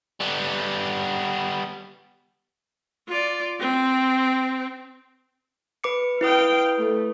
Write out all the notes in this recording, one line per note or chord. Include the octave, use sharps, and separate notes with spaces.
G3 B3
F4 D5
C4
B4 D6 C#7
E4 B4 F5 G5 D#6
A3